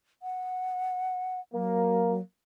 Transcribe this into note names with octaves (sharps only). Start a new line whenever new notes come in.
F#5
F#3 A#3